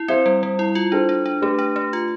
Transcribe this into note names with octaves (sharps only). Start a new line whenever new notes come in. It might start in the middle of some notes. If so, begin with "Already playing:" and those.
Already playing: E4
C4 C5 E5
G3
G3
E4
F4
D4 A4 C5
D4
D4
A3 G4 B4
D4
A3
F4